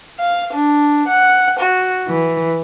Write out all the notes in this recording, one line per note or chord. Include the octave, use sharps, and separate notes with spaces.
F5
D4
F#5
F#4
E3